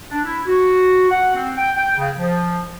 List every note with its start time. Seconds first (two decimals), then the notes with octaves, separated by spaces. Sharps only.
0.11 D4
0.24 E4
0.47 F#4
1.10 F#5
1.34 C4
1.58 G5
1.75 G5
1.97 C#3
2.17 F3